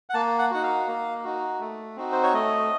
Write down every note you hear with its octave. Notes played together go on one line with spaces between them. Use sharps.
F#5
A#3 A5
F#5
D#4 F#4 F#5
F5
A#3
D#4 F#4
A3
C4 D#4 F#4
C5
C#5
A3 D#5